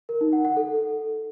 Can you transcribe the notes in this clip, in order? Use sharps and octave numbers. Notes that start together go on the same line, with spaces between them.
A#4
D#4
F#5
F#5
A4